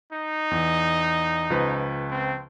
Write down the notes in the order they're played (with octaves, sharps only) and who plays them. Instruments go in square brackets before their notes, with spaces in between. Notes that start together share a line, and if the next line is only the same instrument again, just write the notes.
[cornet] D#4
[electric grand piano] E2
C#2 F3 B4
[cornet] C4